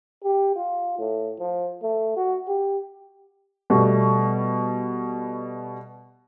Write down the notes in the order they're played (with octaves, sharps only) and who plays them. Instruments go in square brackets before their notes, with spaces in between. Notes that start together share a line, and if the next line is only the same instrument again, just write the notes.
[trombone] G4
F4
A2
F3
A3
F#4
G4
[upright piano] B2 G3 A3